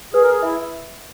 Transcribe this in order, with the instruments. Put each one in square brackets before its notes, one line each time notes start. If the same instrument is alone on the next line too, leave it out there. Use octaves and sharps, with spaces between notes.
[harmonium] G#4 [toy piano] B4
[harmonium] A#4
G#4
[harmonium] E4 [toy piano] E5